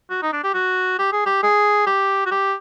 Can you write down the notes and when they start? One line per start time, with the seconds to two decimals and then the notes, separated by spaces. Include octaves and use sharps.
0.10 F#4
0.22 D#4
0.33 D4
0.44 G4
0.54 F#4
0.99 G4
1.13 G#4
1.26 G4
1.43 G#4
1.86 G4
2.26 F#4
2.31 G4